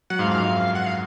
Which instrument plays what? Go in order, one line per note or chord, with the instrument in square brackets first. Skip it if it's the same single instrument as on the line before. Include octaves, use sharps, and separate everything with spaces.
[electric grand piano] F#3 [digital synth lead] F#5
[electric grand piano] G#2 [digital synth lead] F5
[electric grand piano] F2
[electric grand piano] F#2 [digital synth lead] F5
[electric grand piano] G#2
[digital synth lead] F#5
F5